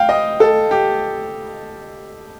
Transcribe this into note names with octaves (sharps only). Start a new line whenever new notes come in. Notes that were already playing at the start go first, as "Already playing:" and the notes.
Already playing: F5 G5
D#5
A4
G4